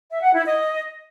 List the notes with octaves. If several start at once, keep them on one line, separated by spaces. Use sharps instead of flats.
E5
F#5
E4
D#5